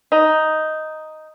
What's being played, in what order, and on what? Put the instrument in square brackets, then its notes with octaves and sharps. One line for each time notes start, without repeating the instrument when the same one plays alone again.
[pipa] D#4